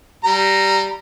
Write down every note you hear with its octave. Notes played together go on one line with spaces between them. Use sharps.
G3 A#5